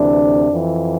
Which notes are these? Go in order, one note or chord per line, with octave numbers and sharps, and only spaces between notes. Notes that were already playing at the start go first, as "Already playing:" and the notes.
Already playing: D2 C3 E3 D4
F2 E3